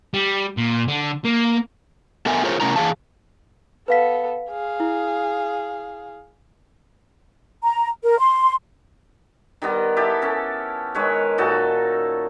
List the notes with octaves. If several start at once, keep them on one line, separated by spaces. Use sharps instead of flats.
G3
A#2
D3
A#3
B3 A4 A#4 E5 G#5
F4 G#4 A#4 C5 C#5
C3 A3 C#4 E4 A#4 A#5
E3 G#4 F5 A5
B3 A4 B4 F5 B6
G#4 F5
E4
A#5
A#4
C6
D#3 G3 B3 D#5
E4 G4 A4 A5
C#4 A4
D#3 G#3 B4 C#5
A#2 D#4 F#4 A4